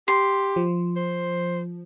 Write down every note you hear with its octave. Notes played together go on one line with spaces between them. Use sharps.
G4 C6
F3
C5